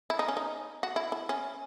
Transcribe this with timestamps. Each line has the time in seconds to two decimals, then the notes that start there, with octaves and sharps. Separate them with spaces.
0.10 E4
0.19 D#4
0.28 C#4
0.37 D#4
0.83 F#4
0.96 E4
1.12 E4
1.29 C#4